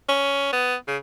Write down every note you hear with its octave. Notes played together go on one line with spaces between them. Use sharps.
C#4
B3
C#3